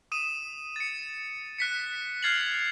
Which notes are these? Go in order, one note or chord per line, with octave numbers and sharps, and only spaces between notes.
D#6 D#7 E7
A6 C#7
F#6 B6 C#7
F6 G#6 A6 C7 F7 F#7